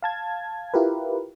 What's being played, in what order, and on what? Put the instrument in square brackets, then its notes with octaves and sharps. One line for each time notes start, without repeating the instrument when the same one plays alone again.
[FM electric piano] F5 A5 G#6
E4 F4 G4 A#4 B4